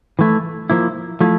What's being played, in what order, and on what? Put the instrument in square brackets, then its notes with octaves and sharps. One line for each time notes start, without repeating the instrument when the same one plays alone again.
[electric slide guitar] E3 A3 E4
F3 A#3 E4
F3 A3 E4